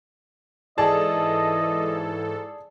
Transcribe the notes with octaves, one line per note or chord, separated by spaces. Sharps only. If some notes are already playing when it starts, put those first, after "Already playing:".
G#2 E3 G#4 A4 D5 D#5 A5